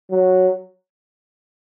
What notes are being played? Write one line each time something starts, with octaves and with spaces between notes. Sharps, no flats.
F#3